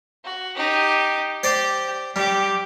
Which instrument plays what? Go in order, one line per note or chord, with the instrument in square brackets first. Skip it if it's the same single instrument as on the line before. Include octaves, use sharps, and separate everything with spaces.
[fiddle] F#4
D#4 G4
[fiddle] G4 [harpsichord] C5 D5 C6
[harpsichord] G3 [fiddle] G4 D6